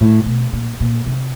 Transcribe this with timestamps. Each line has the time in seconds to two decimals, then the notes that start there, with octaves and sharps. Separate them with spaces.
0.01 A2
0.25 B2
0.53 A#2
0.80 A#2
1.06 C3